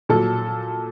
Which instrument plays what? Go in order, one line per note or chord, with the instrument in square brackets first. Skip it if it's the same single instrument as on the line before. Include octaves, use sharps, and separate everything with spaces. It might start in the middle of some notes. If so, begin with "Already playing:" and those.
[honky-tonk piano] A#2 F#3 A4